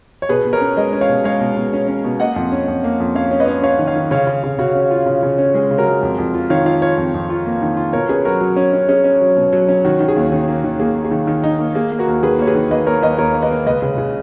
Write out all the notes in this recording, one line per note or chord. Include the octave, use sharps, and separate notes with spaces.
C#5
B2 G#4 B4
B2
A#4 C#5
C#4
G#3 B4 D#5
C#4
C#5 F5
B2
G#3 C#5 F5
B2
B2
C#4
C#4
B2
A#3 D#5 F#5
F2
C#4
F2
A#3
F2
C#4 C#5 F5
C#4
B4 D#5
C#4
C#4 C#5 F5
D#3
C#5 F5
D#3
C#3 C#5 F5
C#3
C#3
C#3 F#4
C#4
F4
C#3
C#3
C#4
G#3 G#4
C#3
F#4 A#4
G#3
F2
F2
F4
D#3 C#5 F5
F4 C#5 F5
F4 C#5 F5
F2
F2
F4
A#3
D#3
F4
B2 A#4 C#5
C#4 G#4 B4
F#3 F#4 A#4
F#3
C#4
C#4
C#4 G#4
C#4
F#3
B2
F#3
C#4
D#3 F#4
D#3
G#4
D#2
D#3
A#3
D#3
A#3 G#4
A#3
G#4
D#3
D#3
D#4
A#3
A#3 G#4
A#3
F#4 A#4
D#2
D#3 G#4 B4
A#3 C#5
G#4 B4
D#3
A#3 B4 D#5
A#3 A#4 C#5
D#2 B4 D#5
D#2 A#4 C#5
A#3
B4 D#5
A#3
C#2 B4 D#5
C#3
C#3